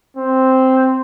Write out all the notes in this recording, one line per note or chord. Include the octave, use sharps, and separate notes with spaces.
C4